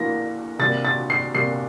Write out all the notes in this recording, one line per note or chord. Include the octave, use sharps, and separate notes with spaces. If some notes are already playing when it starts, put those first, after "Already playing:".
Already playing: E3 A#3 A#6
C3 G3 A#3 A6
A6
C7
C3 G3 A#3 C7